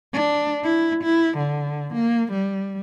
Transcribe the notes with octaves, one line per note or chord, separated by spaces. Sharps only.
D4
E4
E4
D3
A#3
G3